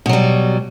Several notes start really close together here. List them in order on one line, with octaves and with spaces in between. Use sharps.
B2 F#3 G3